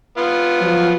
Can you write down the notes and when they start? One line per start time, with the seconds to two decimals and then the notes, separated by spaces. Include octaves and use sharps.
0.18 B3 F4
0.61 F3 F#3